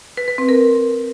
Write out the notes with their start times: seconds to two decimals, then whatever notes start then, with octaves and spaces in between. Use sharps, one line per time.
0.17 B4
0.28 B4
0.38 C4
0.49 A#4